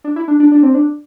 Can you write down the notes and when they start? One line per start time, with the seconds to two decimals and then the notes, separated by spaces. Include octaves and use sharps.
0.04 D4
0.16 E4
0.28 D4
0.40 D4
0.52 D4
0.63 C4
0.74 D4